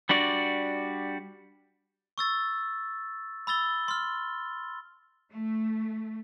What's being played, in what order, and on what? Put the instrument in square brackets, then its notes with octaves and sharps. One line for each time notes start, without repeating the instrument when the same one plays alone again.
[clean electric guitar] G3 D4 F#4 D5
[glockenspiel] C#6 E6 A6
B5 E6 A6 G7
C6 F6
[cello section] A3